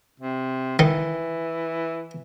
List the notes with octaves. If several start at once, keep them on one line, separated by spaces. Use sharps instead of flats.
C3
D#3 E3